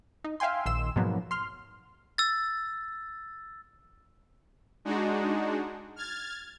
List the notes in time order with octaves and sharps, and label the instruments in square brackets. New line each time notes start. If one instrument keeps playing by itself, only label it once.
[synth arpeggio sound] D#4
E5 F5 G5 G#5 C6
A#1 D#3 C6 E6 E7
G#2 B2 F3 F#3 A#3 B3
C6 F6
[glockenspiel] E6 A6
[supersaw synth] G#3 D4 D#4 F#4
F6 G#6 A6